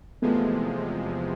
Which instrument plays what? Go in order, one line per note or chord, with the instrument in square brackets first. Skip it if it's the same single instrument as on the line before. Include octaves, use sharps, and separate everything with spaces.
[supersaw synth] E2 C3 F3 G#3 [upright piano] A3 B3